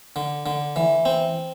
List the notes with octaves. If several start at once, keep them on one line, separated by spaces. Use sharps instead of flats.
D3
D3
E3
C4